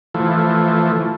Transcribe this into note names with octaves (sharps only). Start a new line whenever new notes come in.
E3 F3 A3